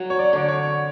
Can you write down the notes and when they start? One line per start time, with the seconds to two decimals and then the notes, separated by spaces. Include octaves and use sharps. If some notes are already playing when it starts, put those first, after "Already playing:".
Already playing: F#3
0.10 C#5
0.19 D5
0.33 D3 D5
0.48 C#5